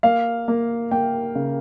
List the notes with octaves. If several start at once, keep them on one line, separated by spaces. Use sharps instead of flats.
A#3 F5
A#3
A#3 G5
C#3